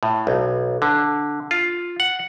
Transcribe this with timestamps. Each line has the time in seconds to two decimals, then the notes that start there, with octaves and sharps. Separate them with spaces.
0.03 A2
0.27 B1
0.82 D3
1.51 F4
2.00 F#5